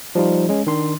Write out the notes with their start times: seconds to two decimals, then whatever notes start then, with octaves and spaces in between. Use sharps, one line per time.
0.15 F3 G3 D#4 F4
0.49 G#3 C#4
0.67 D#3 D4 C6